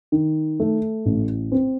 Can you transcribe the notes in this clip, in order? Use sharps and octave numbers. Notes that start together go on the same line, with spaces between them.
D#3
A3
A1
C4